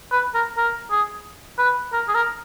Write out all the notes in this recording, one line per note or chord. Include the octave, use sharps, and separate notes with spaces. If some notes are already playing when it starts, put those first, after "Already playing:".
B4
A#4
A#4
G#4
B4
A#4
G#4
A#4